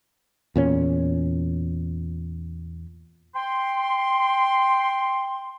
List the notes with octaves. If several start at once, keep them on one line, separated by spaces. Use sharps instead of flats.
E2 A#2 C#4
G5 C6